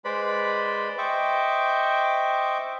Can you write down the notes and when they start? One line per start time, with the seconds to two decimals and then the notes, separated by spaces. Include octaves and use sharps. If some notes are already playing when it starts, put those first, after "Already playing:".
0.05 G#3 B4 C5 D5 B5
0.98 C5 D#5 E5 G5 C#6 D6